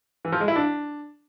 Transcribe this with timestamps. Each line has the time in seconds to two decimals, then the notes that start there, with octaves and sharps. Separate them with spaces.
0.25 E3
0.32 F3
0.40 G#3
0.48 E4
0.56 D4